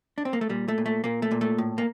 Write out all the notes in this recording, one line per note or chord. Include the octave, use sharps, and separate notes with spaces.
D4
C4
A#3
A3
A#2 G3
A3
A#2
A3
A#2 A#3
A3
A#2
A3
A2
A#3